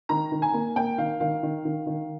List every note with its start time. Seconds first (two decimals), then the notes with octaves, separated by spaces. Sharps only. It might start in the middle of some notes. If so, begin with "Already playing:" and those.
0.09 D#3 A#5
0.32 D#3
0.42 G#5
0.54 A#3
0.76 A#3 G5
0.98 D#3 F5
1.20 D#3 F5
1.43 D#3
1.65 D#3
1.86 D#3